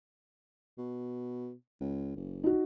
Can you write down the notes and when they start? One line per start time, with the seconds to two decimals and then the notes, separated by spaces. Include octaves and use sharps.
0.78 B2
1.81 C#2
2.16 F#1
2.43 D#4 F#4